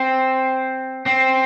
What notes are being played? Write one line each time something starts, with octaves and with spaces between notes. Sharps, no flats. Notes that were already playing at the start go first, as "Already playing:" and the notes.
Already playing: C4
C4